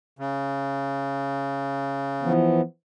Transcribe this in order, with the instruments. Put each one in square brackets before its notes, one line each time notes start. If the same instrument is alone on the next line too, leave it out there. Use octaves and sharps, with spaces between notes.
[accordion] C#3
[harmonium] E3 F3 B3